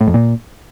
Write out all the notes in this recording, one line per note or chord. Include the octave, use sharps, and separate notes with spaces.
A2
F2
A#2